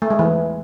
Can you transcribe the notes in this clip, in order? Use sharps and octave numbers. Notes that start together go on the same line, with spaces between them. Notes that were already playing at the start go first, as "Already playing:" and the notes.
A3
G#3
E3